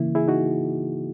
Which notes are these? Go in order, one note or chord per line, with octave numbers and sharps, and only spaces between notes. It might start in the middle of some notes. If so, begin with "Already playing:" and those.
Already playing: C#3 E3 A#3 E4
E4 G#4
D#4 F#4